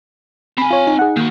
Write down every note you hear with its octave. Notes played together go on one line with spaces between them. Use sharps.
C4 G#5 B5
F4 C#5
D#4
G#4 F#5
D#3 A#3 F#4